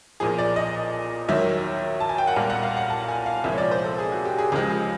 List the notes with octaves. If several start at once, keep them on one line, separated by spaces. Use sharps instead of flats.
B1 A#2 F3 G#4
D5
D#5
D#2 D#3 F#3 E5
A5
G#5
G5
F#5
B1 A#2 G3 F5
F#5
F5
F#5
A5
G#5
F5
C2 A#2 F3 G#3 E5
C#5
D5
C5
A4
G#4
F#4
G4
G#4
C#2 C#3 F3 G#3 G4
G#4